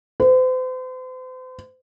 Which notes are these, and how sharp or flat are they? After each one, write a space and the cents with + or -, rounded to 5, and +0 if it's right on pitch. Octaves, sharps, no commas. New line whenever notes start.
C5 -40